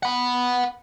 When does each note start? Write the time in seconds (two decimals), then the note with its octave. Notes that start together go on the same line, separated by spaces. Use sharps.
0.03 F#5 B5